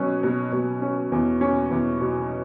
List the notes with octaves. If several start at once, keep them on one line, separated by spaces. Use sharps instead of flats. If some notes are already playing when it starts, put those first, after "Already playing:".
Already playing: B2 F#3 C#4
B2
B2
C#4
E2
C#4
E2
B2